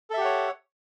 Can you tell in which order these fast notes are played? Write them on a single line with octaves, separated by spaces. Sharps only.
A4 E5 G4 F#5 C#5